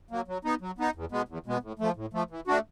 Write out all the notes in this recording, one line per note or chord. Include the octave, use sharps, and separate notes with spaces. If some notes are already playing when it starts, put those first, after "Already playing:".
F#3 A#3
F#3
B3 D#4
F#3
B3 D#4
E2
B2 G#3 B3
E2
B2 G#3 B3
A2
F3 A3
A2
F3 A3
E3
A3 D4 F#4